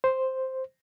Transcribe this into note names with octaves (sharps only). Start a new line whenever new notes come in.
C5